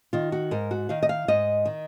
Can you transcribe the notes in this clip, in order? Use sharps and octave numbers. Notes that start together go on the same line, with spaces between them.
D#3 F4
F#4
G#2 A#4
F#4
D#3 F5
D#5
F5
G#2 D#5
D#3